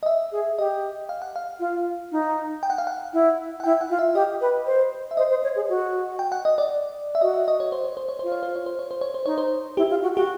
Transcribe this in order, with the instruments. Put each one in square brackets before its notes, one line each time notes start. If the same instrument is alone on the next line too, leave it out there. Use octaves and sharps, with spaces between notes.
[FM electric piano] D#5
E5
[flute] G#4
[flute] G4 [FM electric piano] D#5
[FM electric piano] F5
F#5
F5
[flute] F4
D#4
[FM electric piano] G5
F#5
F5
F#5
[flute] E4
[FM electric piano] F#5
[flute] E4 [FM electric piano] G5
[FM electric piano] F#5
[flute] F4
[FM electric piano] E5
[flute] G4 [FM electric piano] D#5
[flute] B4
C5
[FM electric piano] E5
[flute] C5 [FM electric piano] D#5
[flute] C5
C#5
G#4
F#4
[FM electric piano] G5
F#5
D#5
D5
E5
[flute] F#4 [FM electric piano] D#5
[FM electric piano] E5
D#5
C#5
C5
C#5
C5
C#5
[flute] F4 [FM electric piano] C5
[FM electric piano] C#5
C5
C#5
C5
C#5
C5
C#5
C5
[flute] D#4 [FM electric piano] C#5
[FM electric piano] C5
[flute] E4 [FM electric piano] G4
[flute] F4
F#4
[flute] F#4 [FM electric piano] G4